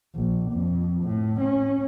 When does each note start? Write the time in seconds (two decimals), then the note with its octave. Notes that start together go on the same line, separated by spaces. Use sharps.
0.15 A#1
0.52 F2
1.05 A2
1.41 C#4